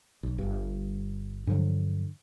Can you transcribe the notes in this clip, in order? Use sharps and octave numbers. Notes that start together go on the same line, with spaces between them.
B1
G1 G2
G2 D3 F3 F#3